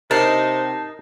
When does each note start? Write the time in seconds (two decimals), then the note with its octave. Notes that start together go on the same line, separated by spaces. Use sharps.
0.11 C3 D#4 A#4 A5 C7